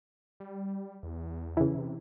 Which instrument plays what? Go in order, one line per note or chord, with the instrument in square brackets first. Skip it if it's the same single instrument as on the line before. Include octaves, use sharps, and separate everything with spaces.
[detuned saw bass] G3
E2
[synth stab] C#3 E3
[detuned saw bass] C3